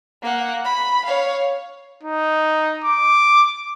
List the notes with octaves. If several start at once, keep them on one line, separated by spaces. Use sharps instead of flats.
A#3 F#5
B5
C#5 F5
D#4
D6